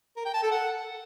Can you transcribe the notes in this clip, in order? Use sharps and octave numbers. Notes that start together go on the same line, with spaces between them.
A#4
G5
A5
A4
F#5